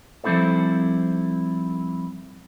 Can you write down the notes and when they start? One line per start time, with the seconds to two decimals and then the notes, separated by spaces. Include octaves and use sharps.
0.24 F3 G3 C4 E4 A4 C5